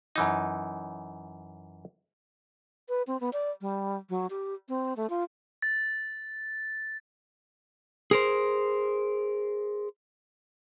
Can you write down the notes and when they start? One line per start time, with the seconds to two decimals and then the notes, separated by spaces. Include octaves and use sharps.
0.16 F#2 E3 D#4
2.89 B4
3.07 C4
3.20 B3
3.33 D5
3.61 G3
4.10 F#3
4.30 G4
4.69 C4
4.97 A3
5.10 F4
5.62 A6
8.11 G#4 A#4 C5